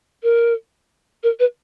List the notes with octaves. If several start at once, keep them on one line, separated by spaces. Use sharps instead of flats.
A#4
A#4
B4